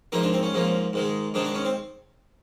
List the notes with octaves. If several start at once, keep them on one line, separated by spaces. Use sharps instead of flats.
G#2 F3 A#3 D#4
D4
C4
C#4
G#2 F3 A#3
G#2 D#3 G#3
G#2 D#3 G#3 D4
D4
C#4
C4